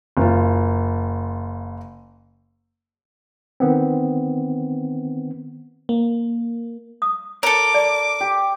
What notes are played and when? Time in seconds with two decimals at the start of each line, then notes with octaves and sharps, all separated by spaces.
0.17 F#1 F4
3.60 D#3 B3 C4
5.89 A#3
7.02 D#6
7.43 A4 A#4 C#5 D6
7.74 D5
8.21 G4